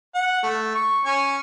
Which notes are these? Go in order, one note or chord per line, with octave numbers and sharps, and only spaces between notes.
F#5
A3
C#6
C#4